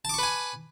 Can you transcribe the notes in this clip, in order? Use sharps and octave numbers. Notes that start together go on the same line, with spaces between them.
B4 G#5 A5 C#6 D6